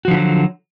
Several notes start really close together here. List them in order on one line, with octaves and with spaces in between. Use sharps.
F#4 F3 D3 E4 F#3